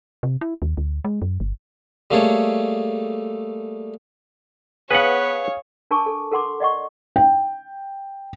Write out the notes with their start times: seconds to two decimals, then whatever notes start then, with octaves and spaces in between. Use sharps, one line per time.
0.23 C3
0.41 E4
0.62 D#2
0.77 D2
1.05 G#3
1.22 F#2
1.40 G1
2.11 G3 A3 A#3 G#4 A4 C#5
4.91 B3 G#4 B4 C#5 F5 F#5
5.91 D4 A#4 G#5 A5 C#6 D6
6.06 A4
6.31 A4 A#4 F#5 C6 D6
6.60 D5 D#5 F#5 C#6
7.16 G5